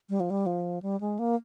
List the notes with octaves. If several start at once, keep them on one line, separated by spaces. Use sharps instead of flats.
G3
F3
G3
F3
G3
G#3
A#3